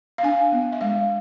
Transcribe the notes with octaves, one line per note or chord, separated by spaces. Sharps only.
F5
D4 G#5
B3
E5
G#3 F5